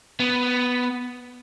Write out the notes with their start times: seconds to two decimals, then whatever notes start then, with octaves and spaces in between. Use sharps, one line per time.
0.20 B3